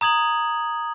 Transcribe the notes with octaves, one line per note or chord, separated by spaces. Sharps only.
A#5 D#6 G#6 F#7